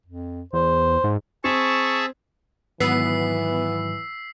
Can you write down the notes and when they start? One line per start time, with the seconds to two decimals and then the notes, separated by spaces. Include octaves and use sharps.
0.06 F2
0.53 E2 C5
1.04 G#2
1.44 C4 G#4 E5 A5 C#6
2.80 G#2 D#3 E3 F#3 B3 E6 B6 C7